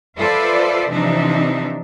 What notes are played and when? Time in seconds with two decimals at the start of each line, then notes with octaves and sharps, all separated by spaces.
0.19 F4 A4 B4 C5 D5 E5
0.92 C3 E3 F3 D4 D#4 E5